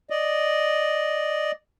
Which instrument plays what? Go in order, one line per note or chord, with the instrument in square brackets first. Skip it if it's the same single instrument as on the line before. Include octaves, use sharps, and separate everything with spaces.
[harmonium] D5 D#5